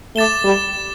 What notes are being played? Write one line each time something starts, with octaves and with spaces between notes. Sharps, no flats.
A3 D6 A6 E7 G7
G3